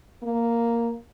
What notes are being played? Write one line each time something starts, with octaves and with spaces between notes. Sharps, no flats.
A#3